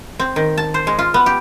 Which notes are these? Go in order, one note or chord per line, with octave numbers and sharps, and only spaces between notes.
C4
D#3
A5
C5
G#3
F4
B3
G4